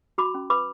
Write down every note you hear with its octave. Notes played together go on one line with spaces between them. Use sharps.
F#4 B5 D6
C#4
B4 B5 D6